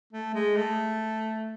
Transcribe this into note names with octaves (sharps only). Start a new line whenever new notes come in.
A3
G#3
A3